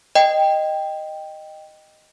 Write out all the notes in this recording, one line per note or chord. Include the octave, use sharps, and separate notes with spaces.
D#5 G5